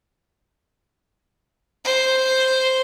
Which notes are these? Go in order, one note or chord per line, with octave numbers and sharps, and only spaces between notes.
C5